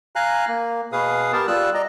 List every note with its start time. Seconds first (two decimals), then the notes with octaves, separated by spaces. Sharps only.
0.16 F5 G#5 A#5 F#6
0.48 A#3
0.92 B2 G#4 B4 F5 D#6
1.33 B3 G4 A#4 A5
1.47 G3 F4 E6 F#6
1.74 D5 D#5 A#5